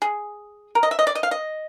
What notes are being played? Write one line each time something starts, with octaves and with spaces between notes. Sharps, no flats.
G#4
A#4
D#5
E5
D#5
D5
D#5
F5
D#5